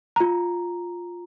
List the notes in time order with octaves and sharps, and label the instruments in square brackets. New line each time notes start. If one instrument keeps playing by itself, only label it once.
[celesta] F4 A#5